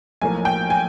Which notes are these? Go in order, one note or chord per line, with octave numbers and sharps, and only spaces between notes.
B1 A2 F3 A#3 G#5
G5
G#5